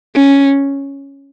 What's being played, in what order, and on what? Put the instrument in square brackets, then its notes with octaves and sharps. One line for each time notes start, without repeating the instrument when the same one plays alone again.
[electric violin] C#4